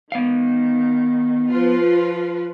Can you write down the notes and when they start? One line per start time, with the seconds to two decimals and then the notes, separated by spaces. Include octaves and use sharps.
0.12 D#3 B3 F5
1.48 F3 F4 B4